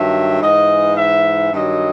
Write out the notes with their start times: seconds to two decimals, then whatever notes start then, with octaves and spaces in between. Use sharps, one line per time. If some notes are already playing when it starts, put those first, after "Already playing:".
Already playing: G2 D#3 F#3 E5
0.42 G#2 E3 D#5
0.97 E5
1.53 G2 D#3 F#3 D#5